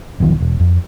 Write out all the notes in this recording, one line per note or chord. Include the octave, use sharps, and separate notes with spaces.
E1 B1 D#3 F3
E1
F2